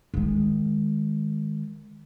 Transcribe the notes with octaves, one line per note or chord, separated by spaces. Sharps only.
D#3 G#3